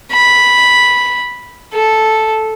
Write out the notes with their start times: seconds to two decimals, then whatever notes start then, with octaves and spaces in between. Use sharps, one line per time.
0.13 B5
1.74 A4